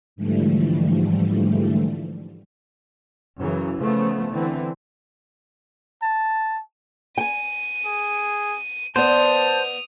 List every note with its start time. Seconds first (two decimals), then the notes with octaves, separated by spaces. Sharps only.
0.16 G#2 D3 E3 F3 G3 A3
3.39 F#2 C#3 E3 F#3
3.78 C#3 F3 A3 B3
4.31 D3 E3 C4
6.02 A5
7.18 G5 G#5 D#7
7.85 G#4
8.96 B3 C5 D5 A5 D#6 F7